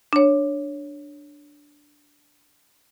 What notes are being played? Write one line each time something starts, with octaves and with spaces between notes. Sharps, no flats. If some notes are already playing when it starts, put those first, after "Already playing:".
D4 C#5